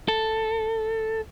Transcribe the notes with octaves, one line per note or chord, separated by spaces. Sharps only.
A4